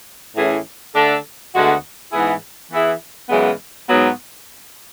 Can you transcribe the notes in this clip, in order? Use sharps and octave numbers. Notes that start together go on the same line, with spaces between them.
A2 E3 A3 C#4 G#4
D3 A3 D4 A4
D2 D3 G#3 B3 F#4
G#2 E3 B3 E4 G#4
E3 B3 E4 G#4
F#2 C#3 E3 G#3 B3
G#2 F#3 B3